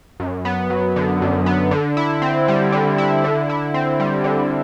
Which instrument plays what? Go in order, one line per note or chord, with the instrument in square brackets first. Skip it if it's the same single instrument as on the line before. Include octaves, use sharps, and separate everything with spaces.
[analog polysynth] F#2
B3
F#3
D3
F#2
B3
D3
E4
C4
G3
D3
E4
D3
E4
C4
G3
D3